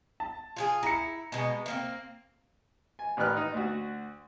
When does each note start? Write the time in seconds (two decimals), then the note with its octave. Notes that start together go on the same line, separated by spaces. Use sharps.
0.20 A5
0.56 F4 F#4 G#4
0.83 E4 A#5 C#7
1.32 B2 G#3 B3
1.66 A3 A#3 C4
2.99 G#5
3.17 A1 D#3 B4 D5 F6 F#6
3.37 D#4
3.54 D2 F#4